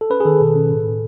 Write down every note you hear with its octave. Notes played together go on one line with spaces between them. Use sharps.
A4
C#4 B4
G#4
D#3 A4
B2
C#4
A2
A2